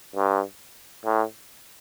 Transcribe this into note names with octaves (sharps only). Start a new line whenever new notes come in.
G2
A2